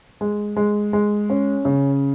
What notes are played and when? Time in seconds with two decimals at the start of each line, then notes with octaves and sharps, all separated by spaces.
0.21 G#3
0.56 G#3
0.93 G#3
1.30 C#4
1.65 C#3